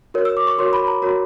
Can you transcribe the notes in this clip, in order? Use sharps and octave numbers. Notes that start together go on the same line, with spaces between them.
F#4 A#4 C#5
E6
D6
C#6
F#4 A#4 C#5 C6
B5
A#5
F#4 A#4 C#5 A#5